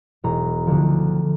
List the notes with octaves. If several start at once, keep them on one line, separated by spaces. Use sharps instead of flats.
E1 A#5
D2 D3 F3